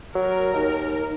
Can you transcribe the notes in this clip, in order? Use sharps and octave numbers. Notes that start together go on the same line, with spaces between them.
F#3 A#4
D#2 D#4